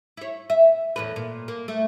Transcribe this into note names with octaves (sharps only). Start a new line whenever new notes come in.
E4 C#5
E5
E2 A2 B4
A#2
A#3
A3